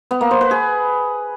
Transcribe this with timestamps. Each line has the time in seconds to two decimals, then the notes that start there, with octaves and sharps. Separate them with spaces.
0.11 B3
0.21 A#3
0.31 C5
0.41 B4
0.51 G#4